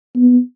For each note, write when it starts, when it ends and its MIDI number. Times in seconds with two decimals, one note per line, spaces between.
0.16 0.39 59